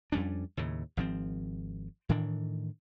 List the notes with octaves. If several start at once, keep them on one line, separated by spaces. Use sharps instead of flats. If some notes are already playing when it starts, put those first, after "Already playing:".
F2 G3 C#4 D4
D#2 A2 C#3
G#1 F3 C4
A2 D#3 E3 D4